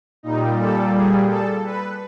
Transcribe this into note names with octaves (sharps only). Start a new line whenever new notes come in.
A#2 G3 D#4
A4
G#4
A4
B4